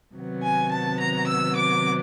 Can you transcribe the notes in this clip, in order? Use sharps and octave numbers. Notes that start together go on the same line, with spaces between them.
C3 D#3 F#3 B3
G#5
A5
A#5
E6
D6